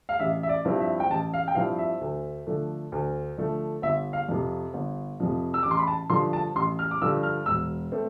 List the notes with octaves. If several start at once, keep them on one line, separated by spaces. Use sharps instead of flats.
F5
A1 E5
E5
D5
G2 F3 C4 E4
E5
G5
A1 A5
F5
G5
G2 F3 C4 E4 F5
E5
D2
D3 F3 A3
D2
D3 F3 A3
G1 E5
F5
F2 C3 F3
G1
F2 C3 F3
E6
A1 D6
C6
B5
A5
G2 D3 F3 C6
A5
A1 C6
F6
D6
G2 D3 F3 E6
F6
E1 E6
A3 C4